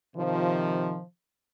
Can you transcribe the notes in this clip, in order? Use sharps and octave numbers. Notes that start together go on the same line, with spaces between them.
C3 D#3 F3